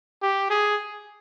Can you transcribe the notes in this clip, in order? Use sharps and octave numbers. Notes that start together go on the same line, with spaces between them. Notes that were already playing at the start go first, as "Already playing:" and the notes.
G4
G#4